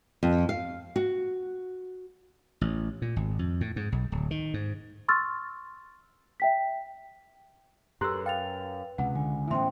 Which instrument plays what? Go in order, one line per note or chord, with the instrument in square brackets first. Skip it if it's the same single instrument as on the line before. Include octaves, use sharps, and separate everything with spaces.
[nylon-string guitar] F2
F5
F#4
[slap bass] A1
A#2
G#1
F2
A2
G#2
B1
D1
D#3
G#2
[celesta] C6 C#6 E6 F6 A6
E5 G5 B6
[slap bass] F#2 [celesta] G4 A4 E6 [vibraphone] B4 [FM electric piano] A#5 C6 F#6
[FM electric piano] F5 [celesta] G5 A6 F7
[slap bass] C#2 [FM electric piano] C3 [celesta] F#5
[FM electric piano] D3 [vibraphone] G#5
[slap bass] A2 E3 B3 [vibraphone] C#4 C5 G5 [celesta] E5 C6